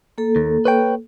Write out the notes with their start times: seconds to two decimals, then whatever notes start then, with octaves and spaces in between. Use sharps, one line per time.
0.18 A#3 A4
0.36 D#2
0.65 B4 C#5 G5